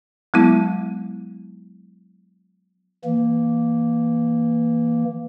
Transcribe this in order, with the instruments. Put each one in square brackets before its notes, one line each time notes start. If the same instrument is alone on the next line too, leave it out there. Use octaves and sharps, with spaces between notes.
[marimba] F#3 G#3 B3 E4
[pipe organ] E3 A#3